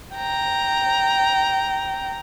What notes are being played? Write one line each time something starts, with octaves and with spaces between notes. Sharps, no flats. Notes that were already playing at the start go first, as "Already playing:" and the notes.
G5 A#5